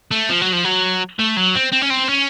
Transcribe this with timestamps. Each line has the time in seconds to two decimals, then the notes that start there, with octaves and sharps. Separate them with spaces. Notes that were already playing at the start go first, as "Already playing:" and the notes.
0.11 A3
0.29 F3
0.42 F#3
0.53 F3
0.65 F#3
1.19 A3
1.37 F#3
1.55 C4
1.73 C4
1.82 C#4
1.90 C4
2.09 C#4